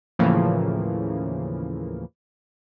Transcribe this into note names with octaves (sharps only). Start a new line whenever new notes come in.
D#2 A2 C#3 E3 F3 A#3